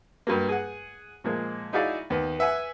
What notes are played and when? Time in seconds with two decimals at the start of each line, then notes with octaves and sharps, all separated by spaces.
0.27 G2 F#3 A#3
0.49 G#4 F#5
1.24 A#2 F3 G#3 A#3
1.73 D#4 E4 F#4 G#4 D5 F5
2.10 D#2 B3
2.39 B4 E5 F#5 G#5